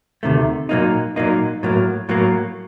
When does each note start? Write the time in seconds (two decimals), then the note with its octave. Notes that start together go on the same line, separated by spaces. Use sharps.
0.23 D2 C3 D#3 A3
0.69 A#2 F#3 A#3 D#4
1.16 A#2 F#3 A#3 D#4
1.63 A2 F#3 A#3
2.09 A2 F#3 A#3